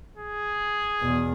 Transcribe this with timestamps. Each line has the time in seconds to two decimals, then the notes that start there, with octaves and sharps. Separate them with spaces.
0.17 G#4
1.00 E2 B2